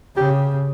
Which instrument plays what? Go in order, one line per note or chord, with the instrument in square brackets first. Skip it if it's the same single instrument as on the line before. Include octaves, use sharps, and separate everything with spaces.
[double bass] C#3 [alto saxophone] G4